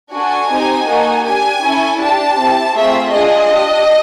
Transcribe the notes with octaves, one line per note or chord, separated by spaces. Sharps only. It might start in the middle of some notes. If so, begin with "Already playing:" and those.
D4 F#4 A4 G#5
C4 D#4 G4
A#3 D#4 F#4 A4
D4 G4 G#5
C#4 E4 A4
D4 G4 A5
C4 E4 G4
A3 C4 F4 G#4 E5
D4 F4 G#4 D#5
D4 G4